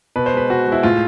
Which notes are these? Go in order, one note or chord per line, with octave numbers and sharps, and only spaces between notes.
B2 B4
C5
G#3 B4
B2 F#4
G#3
E4
A2 F4